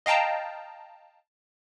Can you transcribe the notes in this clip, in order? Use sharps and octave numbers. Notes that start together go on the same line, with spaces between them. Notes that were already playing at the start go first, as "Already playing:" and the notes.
D#5 F5 G5 A5 A#5